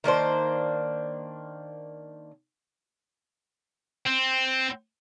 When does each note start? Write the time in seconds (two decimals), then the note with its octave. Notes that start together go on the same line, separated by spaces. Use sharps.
0.04 D#3 A#3 D4 C5
4.06 C4